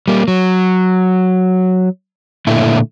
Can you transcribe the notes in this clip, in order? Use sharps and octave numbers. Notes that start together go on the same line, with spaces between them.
G3 A#3
F#3
A#2 D3 A3 E4